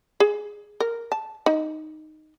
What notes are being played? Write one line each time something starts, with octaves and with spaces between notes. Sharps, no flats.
G#4
A#4
A5
D#4